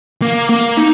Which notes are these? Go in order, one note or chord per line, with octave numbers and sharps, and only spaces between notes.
A#3
A#3
D#4